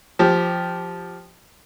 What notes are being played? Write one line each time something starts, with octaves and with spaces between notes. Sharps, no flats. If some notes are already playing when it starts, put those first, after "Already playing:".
F3 G4